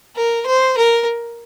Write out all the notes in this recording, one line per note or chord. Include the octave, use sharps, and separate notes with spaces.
A#4
C5
A#4